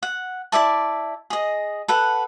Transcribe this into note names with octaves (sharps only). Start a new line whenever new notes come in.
F#5
E4 D5 E5 A5
G#4 D#5
A4 B4 F#5